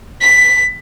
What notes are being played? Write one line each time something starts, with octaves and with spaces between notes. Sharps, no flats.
B6